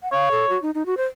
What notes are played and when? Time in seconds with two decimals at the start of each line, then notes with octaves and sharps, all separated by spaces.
0.03 F#5
0.12 C#5 F5
0.31 A4
0.49 F#4
0.62 D#4
0.75 D#4
0.86 F#4
0.97 C5